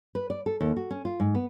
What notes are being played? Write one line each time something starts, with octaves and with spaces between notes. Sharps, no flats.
B4
D5
A4
D#2
F#4
C#4
F4
G#2
B3